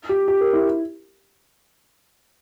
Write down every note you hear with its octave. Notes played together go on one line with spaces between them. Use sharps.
G4
G4
A#4
E4